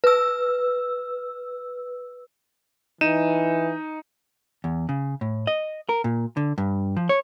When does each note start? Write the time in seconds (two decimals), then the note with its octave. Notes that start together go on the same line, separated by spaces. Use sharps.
0.04 B4 E6
3.01 E3 D#4 D#7 E7
4.64 E2
4.89 C#3
5.21 A2
5.47 D#5
5.89 A#4
6.04 A#2
6.37 D3
6.58 G2
6.97 F3
7.09 C#5